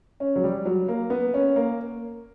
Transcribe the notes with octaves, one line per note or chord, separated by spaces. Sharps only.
C#4
F#3
G3
F#3
A#3
B3
C#4
A#3